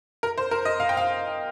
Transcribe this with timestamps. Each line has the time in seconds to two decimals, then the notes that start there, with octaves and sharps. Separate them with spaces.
0.23 A#4
0.38 C5
0.51 A#4
0.65 D#5
0.80 F5
0.89 G5
0.97 F5